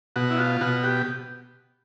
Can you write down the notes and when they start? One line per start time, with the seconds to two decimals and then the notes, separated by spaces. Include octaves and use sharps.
0.16 B2 F#4
0.31 E4
0.38 F4
0.61 B2 F#4
0.83 G4